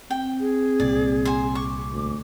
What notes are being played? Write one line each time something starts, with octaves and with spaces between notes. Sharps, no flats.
C4 G5
G#4
C2 A#2 D5
C5 G#5
C#6 D6
D2